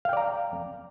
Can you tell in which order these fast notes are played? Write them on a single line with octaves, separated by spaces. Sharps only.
F5 G5 D5 A#5